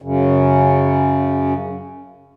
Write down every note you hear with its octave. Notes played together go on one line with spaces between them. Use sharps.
F#2 C#3